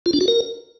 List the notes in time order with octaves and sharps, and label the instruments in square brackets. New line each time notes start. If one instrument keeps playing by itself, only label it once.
[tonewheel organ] F4
D4
F#4
A#4